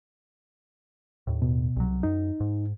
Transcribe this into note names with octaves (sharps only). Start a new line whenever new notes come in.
D#2 A2
B2
C2 F#3
F#2 D#4
G#2